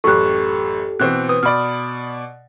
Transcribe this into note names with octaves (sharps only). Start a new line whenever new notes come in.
A1 F#2 G4 A4 C#6 F#6
B2 E3 C4 F#6
B4 D#6
B2 D5 B5 F6